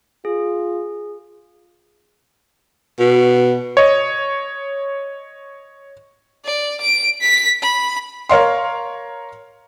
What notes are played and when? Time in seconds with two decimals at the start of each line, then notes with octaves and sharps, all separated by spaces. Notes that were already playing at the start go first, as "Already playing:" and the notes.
0.25 F4 G#4
2.99 B2
3.77 C#5 D#5
6.45 D5
6.81 D7
7.21 B6
7.62 B5
8.29 A#4 C#5 F5 C6